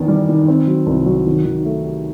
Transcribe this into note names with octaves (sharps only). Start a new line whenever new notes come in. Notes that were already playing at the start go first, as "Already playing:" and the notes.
Already playing: E2 D#3
G3
D#3
C4
F#3
C2
F#3
D#3
D#3
A3
G4